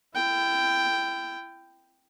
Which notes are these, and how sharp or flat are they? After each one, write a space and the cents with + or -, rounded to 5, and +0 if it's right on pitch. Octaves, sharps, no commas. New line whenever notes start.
E4 +35 G5 +0